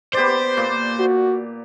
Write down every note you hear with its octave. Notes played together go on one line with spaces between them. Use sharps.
B3 G4 C5 D5
A#2 D5
F#4